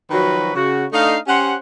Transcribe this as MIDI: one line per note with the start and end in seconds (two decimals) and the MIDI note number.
0.11 0.52 51
0.11 0.52 53
0.11 0.52 54
0.11 0.52 66
0.11 0.52 71
0.55 0.85 49
0.55 0.85 66
0.93 1.17 57
0.93 1.17 62
0.93 1.17 63
0.93 1.17 75
0.93 1.17 77
1.28 1.55 61
1.28 1.55 67
1.28 1.55 72
1.28 1.55 78